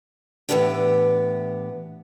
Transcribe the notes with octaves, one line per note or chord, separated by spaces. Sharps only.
A2 E3 A#3 B3 D4 G4